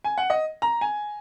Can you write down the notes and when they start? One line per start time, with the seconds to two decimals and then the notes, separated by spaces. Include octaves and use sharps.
0.04 G#5
0.18 F#5
0.30 D#5
0.62 A#5
0.81 G#5